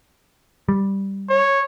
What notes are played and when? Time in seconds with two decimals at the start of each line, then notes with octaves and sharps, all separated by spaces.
0.69 G3
1.29 C#5